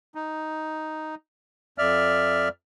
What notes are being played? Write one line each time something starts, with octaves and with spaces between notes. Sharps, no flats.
D#4
F2 D5 E5 F6